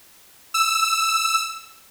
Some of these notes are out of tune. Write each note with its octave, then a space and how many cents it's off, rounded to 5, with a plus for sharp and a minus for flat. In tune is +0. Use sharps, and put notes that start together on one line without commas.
E6 +0